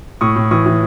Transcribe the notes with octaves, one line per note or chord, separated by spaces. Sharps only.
A2 C#6 D#6
A2
E3 C#6 D#6
E3